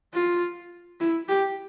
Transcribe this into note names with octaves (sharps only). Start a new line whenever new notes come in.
F4
E4
G4